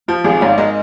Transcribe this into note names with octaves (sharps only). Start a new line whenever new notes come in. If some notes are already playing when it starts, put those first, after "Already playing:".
F3 F4
G#1 G#4
G#2 C#5 F5
G#3 A#4 D#5